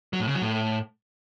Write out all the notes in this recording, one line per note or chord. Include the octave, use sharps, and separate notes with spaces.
F#3
A2
C#3
F#3
A2